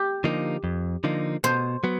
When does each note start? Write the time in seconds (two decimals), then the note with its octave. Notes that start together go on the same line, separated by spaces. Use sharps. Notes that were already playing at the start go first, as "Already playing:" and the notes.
Already playing: G4
0.24 D3 F3 A#3 D#4
0.64 F2
1.04 D3 F3 A#3 D#4
1.44 B2 C5
1.84 F#3 B3